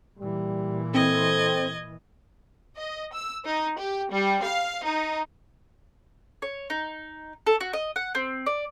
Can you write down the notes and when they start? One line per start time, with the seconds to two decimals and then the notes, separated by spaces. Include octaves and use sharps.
0.19 A#2 E3 G3
0.94 C4 A4 D#5 G#6
2.76 D#5
3.13 E6
3.44 D#4
3.79 G4
4.11 G3
4.43 F5
4.83 D#4
6.42 C#5
6.70 D#4
7.47 A4
7.61 F#4
7.73 D#5
7.96 F#5
8.15 C4
8.46 D5